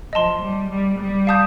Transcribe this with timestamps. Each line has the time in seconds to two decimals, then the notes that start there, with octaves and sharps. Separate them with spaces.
0.13 F3 D#5 A5 C6
0.42 G3
0.70 G3
0.99 G3
1.27 F5 A5 D#6 G6